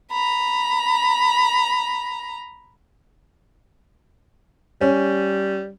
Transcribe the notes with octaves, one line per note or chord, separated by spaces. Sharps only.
A#5 B5
G3 C#4